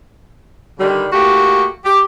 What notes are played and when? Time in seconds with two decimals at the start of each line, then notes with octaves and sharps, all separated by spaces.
0.80 D3 D#3 G3
1.12 A3 A#3 F#4 G4
1.85 G4